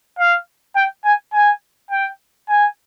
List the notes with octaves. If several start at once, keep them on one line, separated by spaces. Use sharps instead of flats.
F5
G5
G#5
G#5
G5
G#5